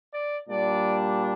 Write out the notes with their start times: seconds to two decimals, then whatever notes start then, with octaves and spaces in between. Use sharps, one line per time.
0.13 D5
0.47 A#2 G3 D4 D5